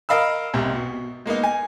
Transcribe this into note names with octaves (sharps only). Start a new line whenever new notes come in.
A#4 D#5 F5 B5 E6
B1 G#2 C3
B2
G#3 A#3 B3 D#4
G#5